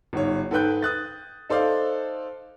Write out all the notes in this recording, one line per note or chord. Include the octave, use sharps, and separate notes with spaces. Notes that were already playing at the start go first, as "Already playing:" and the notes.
G1 G#2 C#5
G#2 A4 B4 G5 F#6 G6
D#6 F#6 A6
D#4 A4 C5 D5 F5